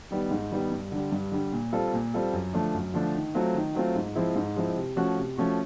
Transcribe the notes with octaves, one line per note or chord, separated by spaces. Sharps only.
D#3 G3 B3
G#2
D#3 G3 B3
G2
D3 G3
G2
D3 G3
A#2
G3 C4 F4 A4
A#2
G3 C4 F4 A4
F#2
D3 F3 A3 D4
F#2
D3 F3 A3 D4
D#3
F#3 A3 C4 F4
D#3
F#3 A3 C4 F4
G#2
F3 G#3 C4 E4
G#2
F3 G#3 C4 E4
C3
F3 A3 C#4 F#4
C3
F3 A3 C#4 F#4